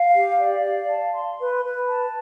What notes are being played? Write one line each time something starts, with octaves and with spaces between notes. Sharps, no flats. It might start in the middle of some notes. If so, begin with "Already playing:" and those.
Already playing: F5
G4
D5
F5
A5
C6
B4
B4
A5